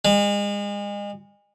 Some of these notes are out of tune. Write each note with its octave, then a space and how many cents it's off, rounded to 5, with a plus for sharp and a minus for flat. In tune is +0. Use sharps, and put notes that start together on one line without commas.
G#3 -35